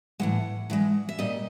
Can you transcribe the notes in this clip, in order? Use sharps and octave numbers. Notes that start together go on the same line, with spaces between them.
A2 E3 G#3 F#5
A2 E3 G#3
E5
A#2 G3 D#5